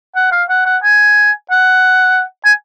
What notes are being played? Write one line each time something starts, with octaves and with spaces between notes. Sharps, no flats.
F#5
F5
F#5
F#5
G#5
F#5
G#5